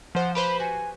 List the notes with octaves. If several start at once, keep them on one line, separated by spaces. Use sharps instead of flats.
F3 C5 F#5
G4 B4 C5 B5
F#4 G#5